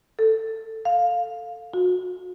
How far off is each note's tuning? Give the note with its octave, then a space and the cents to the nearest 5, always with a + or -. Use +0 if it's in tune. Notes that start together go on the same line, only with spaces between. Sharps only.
A4 +10
F5 +10
F#4 -30